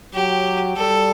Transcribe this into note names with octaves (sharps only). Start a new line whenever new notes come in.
F#3 G4
G3 A4